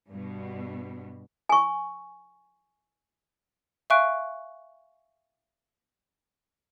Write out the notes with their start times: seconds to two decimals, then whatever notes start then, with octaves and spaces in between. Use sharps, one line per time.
0.11 G2 B2
1.49 G#5 C#6
3.90 E5 F5 G#5 C#6 F#6 D7